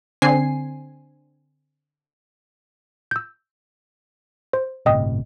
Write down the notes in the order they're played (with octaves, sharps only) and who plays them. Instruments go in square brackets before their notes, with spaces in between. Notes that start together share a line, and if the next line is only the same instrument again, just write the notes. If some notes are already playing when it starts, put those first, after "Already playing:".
[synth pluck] D3 C4 G#5 C7
[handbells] E6 G6
C5
[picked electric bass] G1 A2 C3 [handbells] D#5 G5 D#6